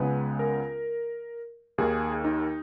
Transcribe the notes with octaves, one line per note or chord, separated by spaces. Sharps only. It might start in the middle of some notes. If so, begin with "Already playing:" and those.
Already playing: C#2 C#3 G#3 B3 B4
A#4
D#2 D#3 A#3 G#4
D#4